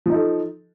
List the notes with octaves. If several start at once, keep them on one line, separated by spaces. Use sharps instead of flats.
F3 D#4 A4